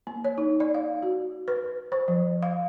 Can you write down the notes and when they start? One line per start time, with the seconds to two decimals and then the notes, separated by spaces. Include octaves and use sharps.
0.07 A#3
0.25 C#5
0.38 D#4
0.60 D5
0.75 F5
1.03 F#4
1.48 B4
1.92 C5
2.08 F3
2.43 F5